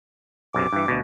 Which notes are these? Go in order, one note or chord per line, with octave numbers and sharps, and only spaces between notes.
B1 F#2 C3 D6
G2 E3
D2 B2